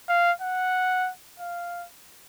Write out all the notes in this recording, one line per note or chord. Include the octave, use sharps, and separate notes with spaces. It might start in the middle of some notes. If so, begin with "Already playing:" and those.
F5
F#5
F5